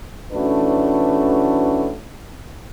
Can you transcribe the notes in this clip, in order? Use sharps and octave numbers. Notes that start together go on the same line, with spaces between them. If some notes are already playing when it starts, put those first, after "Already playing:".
E3 A3 C#4 D4 F#4 B4